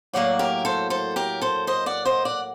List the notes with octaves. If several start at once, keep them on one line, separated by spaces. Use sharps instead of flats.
A2 F#3 A#3 D5 F#5
G4 A#4
A4 C5
A4 C5
G4 A#4
A4 C5
C5 D#5
D5 F#5
C5 D#5
D5 F#5